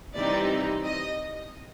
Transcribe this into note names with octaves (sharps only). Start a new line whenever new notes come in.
C3 E3 G3 C4 D#4 D5
D#5